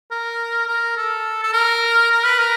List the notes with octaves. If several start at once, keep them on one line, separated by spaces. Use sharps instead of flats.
A#4
A#4
A4
A4
A#4
A#4
B4
A#4